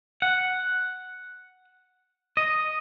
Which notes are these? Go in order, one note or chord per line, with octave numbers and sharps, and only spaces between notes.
F#5
D#5